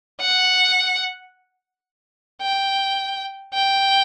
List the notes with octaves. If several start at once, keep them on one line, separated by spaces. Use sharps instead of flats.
F#5
G5
G5